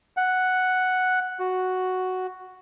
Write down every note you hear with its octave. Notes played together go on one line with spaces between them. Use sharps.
F#5
F#4